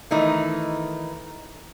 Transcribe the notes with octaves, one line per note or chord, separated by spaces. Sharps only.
D#3 E3 A3 D#4